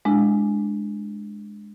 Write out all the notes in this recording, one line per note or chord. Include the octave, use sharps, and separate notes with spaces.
G#3 D4 E4